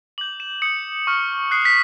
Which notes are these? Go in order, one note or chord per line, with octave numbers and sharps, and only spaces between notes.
D6 G6 F#7
E7
D#6 G6 C#7
C#6 F6
D#6 F#6 C7
B6